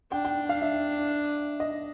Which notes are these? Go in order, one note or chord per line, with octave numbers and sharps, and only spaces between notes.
D4 G5
G5
F5
E5
D#5